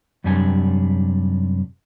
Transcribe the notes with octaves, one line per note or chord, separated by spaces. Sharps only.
F#2 C3 G3 D4 G#5